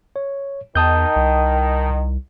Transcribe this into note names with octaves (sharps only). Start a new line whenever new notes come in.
C#5
E2 D#3 A5 D#6 G6
C2